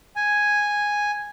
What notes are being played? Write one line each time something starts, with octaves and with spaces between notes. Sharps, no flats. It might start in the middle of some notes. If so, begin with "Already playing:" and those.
G#5